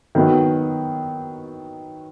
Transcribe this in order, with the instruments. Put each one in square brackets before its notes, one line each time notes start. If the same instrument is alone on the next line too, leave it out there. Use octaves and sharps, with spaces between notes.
[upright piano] D#3 F#3 B3 D#4